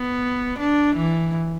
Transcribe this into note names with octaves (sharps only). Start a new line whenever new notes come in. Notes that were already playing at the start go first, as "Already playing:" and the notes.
Already playing: B3
D4
E3